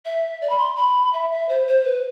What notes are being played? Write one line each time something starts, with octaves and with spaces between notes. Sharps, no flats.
E5
D5
B5
C6
B5
E5
E5
C5
C5
B4